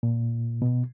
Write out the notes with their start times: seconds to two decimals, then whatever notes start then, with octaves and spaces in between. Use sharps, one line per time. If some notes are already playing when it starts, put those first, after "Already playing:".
0.03 A#2
0.62 B2